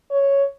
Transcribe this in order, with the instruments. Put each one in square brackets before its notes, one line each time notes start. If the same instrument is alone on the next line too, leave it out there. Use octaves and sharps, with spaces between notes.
[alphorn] C#5